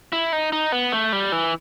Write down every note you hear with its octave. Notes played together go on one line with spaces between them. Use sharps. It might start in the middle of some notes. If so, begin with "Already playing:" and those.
E4
D#4
D#4
B3
A3
G3
E3